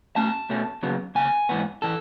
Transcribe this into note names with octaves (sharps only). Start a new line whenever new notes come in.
B2 A3 C#4 A5
B2 A3 C#4
D#2 C#3 F#3 B3
D#2 C#3 G#5
G#2 E3 B3
E3 A4